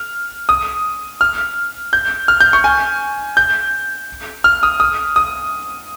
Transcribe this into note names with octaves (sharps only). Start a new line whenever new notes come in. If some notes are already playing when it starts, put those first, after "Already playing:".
Already playing: F6
D#6
F6
G6
F6
G6
C#6
G#5
G6
F6
D#6
D#6
D#6